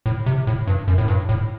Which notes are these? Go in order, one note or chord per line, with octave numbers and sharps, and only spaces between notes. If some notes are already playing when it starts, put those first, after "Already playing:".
A2
C3
A2
G2
F#2
A2
G2
A2